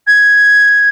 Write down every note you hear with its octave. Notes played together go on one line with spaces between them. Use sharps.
G#6